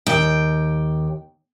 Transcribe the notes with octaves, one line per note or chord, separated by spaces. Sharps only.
D#2 G5